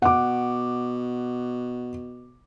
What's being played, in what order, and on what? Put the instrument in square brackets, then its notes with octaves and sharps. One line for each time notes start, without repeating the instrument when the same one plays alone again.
[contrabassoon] B2 [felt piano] F#5 D6